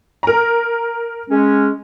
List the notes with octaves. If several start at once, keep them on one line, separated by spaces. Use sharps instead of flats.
A#4 A#5
G#3 C#4